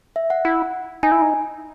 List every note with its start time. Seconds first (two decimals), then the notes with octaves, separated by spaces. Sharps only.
0.16 E5
0.30 F#5
0.45 E4 F#5
1.03 D#4 G#5
1.12 E4
1.22 D#4